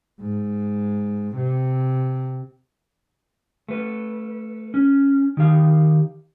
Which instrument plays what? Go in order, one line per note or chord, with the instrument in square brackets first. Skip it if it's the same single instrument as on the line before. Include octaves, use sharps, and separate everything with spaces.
[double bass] G#2
C3
[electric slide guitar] A3 B4
C#4
D#3 G4 F5